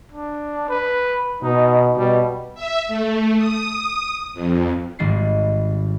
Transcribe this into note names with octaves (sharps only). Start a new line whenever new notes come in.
D4
B4
B2 D#4
B2 G3
E5
A3
D#6
F2
G#1 G#2 D#3 G3 A6 C7